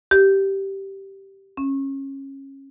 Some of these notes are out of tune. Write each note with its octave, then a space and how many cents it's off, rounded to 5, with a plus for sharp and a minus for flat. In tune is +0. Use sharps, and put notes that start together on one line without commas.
G4 -10
C#4 -25